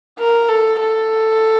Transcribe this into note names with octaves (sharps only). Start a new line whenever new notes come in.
A#4
A4
A4